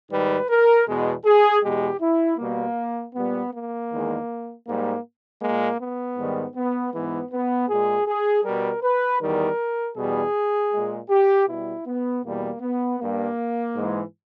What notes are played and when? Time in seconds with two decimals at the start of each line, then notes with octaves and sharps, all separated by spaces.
0.10 G#2 D#3 G3 B4
0.49 A#4
0.86 E2 B2 G#3
1.24 G#4
1.62 E2 B2 G#3 G4
2.00 E4
2.38 B2 G3 A#3
3.14 A#2 G3 B3
3.52 A#3
3.90 E2 D#3 G#3
4.65 G#2 G3 A#3
5.41 A#2 G#3 A#3
5.79 B3
6.17 G#2 D#3 G3
6.55 B3
6.92 G#2 E3 G#3 B3
7.31 B3
7.69 A#2 G#3 G#4
8.06 G#4
8.44 B2 G3 A#4
8.82 B4
9.20 E2 D#3 G3 A#4
9.96 E2 B2 G3 G#4
10.72 A#2 G#3
11.09 G4
11.47 B2 G3 E4
11.85 B3
12.23 E2 B2 G3 A#3
12.61 B3
12.99 G2 G3 A#3
13.75 G#2 E3 G#3